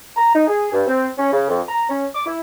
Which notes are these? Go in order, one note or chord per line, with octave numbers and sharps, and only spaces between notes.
A#5
D#4
G#4
G2
C4
C#4
C#3
F2
A#5
C#4
D6
E4